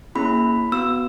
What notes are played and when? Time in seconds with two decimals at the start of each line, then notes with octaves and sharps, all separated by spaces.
0.15 A#3 C#4 E4 G#4 B5
0.72 B3 F#4 E6